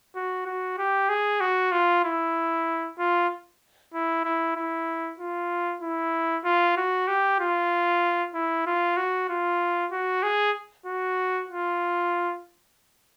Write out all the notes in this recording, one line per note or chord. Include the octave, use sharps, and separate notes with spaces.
F#4
F#4
G4
G#4
F#4
F4
E4
F4
E4
E4
E4
F4
E4
F4
F#4
G4
F4
E4
F4
F#4
F4
F#4
G#4
F#4
F4